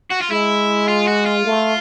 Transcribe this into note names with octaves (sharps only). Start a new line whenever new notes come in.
F#4
F4
G#3 E4
F4
F#4
F4
A3